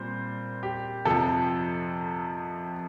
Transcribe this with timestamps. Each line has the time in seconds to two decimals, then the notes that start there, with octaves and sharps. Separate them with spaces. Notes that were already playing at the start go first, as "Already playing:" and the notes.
Already playing: A#2 G3 C4 C5
0.63 G4
1.05 F2 C3 F3 A4